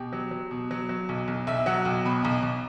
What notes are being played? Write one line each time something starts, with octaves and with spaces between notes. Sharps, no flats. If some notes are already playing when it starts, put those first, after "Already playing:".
Already playing: B2 G4
F#3
F#3
B2
F#3
F#3
B1
B1
B1 E5
F#3 F#5
B1 G5
B2 B5
B1 A#5
B1